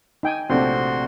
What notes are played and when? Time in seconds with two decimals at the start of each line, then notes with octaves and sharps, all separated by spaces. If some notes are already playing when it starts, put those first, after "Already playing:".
0.23 D#4 G5 G#5
0.50 A#1 C3 A3 C4 D4 F#4 C6